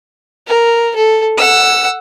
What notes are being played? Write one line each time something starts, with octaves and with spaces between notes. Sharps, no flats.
A#4
A4
F#5 E6